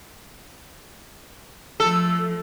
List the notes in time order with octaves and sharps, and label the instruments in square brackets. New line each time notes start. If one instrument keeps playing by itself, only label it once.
[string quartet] F3 A3 [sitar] A4